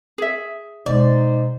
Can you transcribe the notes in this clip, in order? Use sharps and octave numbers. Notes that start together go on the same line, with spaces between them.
G#4 E5
G#2 B2 G#3 D#4 C5 D5